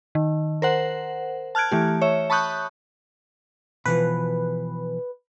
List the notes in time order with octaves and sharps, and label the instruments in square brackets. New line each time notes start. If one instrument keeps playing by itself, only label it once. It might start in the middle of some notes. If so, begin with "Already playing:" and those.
[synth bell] D#3
A#4 C5 F#5
A5 F6 F#6 G#6 D7
E3 A3 G4
C#5 E5
A5 B5 C#6 D#6 F#6 G6
[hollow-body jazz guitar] B2 E3 F3 [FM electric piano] B4